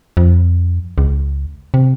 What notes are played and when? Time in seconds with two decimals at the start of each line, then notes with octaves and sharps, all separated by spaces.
0.17 F2
0.98 C#2
1.74 C3